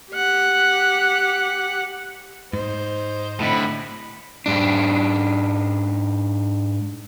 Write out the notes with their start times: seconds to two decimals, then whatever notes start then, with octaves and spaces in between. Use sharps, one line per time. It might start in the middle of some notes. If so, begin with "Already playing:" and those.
0.11 G4 F#5
2.53 G#2 D#4 C5
3.40 A2 D3 D#5 B5
4.46 G#2 D4